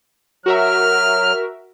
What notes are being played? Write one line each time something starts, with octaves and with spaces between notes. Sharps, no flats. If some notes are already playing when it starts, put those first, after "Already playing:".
F#3 F#4 A#4 E5 F6